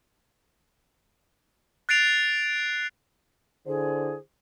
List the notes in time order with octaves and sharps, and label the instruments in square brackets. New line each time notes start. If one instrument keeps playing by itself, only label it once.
[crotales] F#6 A6 C7 D7 F7
[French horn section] D3 E4 C5 [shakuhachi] G#4